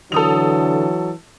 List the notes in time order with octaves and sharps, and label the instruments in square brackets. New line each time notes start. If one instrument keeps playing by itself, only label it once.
[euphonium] D3 [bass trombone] E3 [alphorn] F#3 [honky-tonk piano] A4 D#6 F7